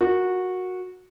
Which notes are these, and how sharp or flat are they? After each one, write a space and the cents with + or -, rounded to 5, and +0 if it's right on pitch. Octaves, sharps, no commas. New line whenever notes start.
F#4 -15 A#4 +0